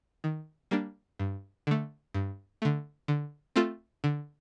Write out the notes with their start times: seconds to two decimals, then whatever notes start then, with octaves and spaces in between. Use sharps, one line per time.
0.24 D#3
0.71 G3 A#3 D4
1.19 G2
1.67 D3 A3
2.14 G2
2.62 D3 A3
3.08 D3
3.56 A3 C4 F4 A4
4.04 D3